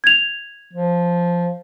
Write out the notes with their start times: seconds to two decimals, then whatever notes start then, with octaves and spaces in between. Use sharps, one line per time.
0.04 G#6 F7
0.73 F3